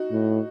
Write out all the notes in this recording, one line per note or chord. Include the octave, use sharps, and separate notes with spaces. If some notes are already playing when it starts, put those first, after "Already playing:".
Already playing: D#4 F#4
A2